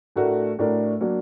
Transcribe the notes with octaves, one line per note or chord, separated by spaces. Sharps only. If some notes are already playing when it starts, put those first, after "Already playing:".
A2 A3 D4 F#4 A#4
A2 A3 D4 F#4 A#4
F#3 A#3 D4